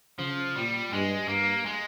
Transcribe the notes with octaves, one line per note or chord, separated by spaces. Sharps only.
C#3 F3
A#2 G3
G2 G#3
G2 A#3
G#3